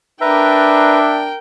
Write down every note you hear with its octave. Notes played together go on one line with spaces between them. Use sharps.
D4 A#4 B4 E5 G5 A#5